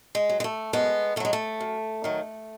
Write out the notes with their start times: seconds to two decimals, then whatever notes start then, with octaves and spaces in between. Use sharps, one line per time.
0.15 G#3
0.29 F#3
0.40 G#3
0.44 A3
0.73 F#2 G#3 B3
1.16 D#3 A3
1.20 F#3 G#3
1.33 A3
1.60 F#2
2.04 D#3 F#3